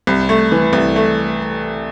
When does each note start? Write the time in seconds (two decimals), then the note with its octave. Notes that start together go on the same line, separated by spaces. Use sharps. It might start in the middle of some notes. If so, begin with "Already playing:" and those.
0.07 C2
0.29 A3
0.52 E3
0.73 C2
0.96 A3